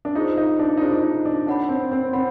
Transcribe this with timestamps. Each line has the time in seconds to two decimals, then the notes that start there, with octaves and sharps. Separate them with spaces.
0.05 D4
0.15 D#4 F4 G#4 C5
0.37 D#4
0.59 D4
0.77 D#4
0.81 D4 F4 G#4 C5
1.03 D#4
1.25 D4
1.47 D4 C#5 F#5 B5
1.69 C4
1.92 C4
2.13 C4 C#5 F#5 B5